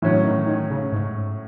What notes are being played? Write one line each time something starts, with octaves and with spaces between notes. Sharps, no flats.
A2 E3 F#3 C#4
D#3
D#3
C#3
G#2